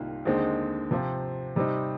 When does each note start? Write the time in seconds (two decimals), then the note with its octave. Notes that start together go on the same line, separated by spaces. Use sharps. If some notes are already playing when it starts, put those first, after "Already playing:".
Already playing: C2 C3 D#3 A#3 F4
0.25 D#2 D3 G#3 C4 D#4
0.91 C3 F3 C4 F4
1.56 C3 G3 C4 D#4